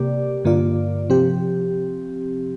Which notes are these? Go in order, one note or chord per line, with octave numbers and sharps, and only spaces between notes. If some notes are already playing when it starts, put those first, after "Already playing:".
Already playing: C3 A#3 G4 D5
G2 D3 A#3 F4 D5
C3 F3 C4 G4